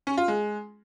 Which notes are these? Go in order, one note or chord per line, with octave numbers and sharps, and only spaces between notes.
C#4
F4
G#3